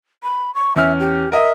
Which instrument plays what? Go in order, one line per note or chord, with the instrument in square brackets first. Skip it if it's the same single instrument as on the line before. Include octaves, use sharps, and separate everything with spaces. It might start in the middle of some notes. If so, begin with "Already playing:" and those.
[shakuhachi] B5
C#6
[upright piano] E2 C#4 F6 [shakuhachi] E5
[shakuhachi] G4
[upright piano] A#4 D#5 [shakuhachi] E5